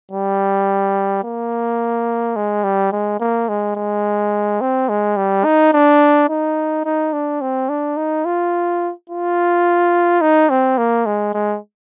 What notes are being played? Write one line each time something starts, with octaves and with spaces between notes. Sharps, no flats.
G3
A#3
G#3
G3
G#3
A#3
G#3
G#3
C4
G#3
G3
D#4
D4
D#4
D#4
D4
C4
D4
D#4
F4
F4
D#4
C4
A#3
G#3
G#3